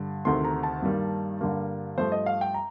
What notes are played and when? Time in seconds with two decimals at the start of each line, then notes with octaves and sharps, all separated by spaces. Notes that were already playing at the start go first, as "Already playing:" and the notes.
Already playing: G2 D3
0.25 D2 C3 D#3 A3 C6
0.45 A#5
0.63 A5
0.82 G2 D#3 G3 A#3
1.41 G2 D3 G3 A#3
1.98 G2 F3 A3 C5
2.12 D#5
2.26 F5
2.41 G5
2.54 A#5